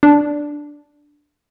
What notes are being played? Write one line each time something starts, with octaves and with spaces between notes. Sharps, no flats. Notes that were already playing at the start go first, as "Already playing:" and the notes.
D4